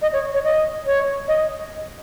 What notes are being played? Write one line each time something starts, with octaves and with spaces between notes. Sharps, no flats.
D#5
C#5
C#5
D#5
C#5
D#5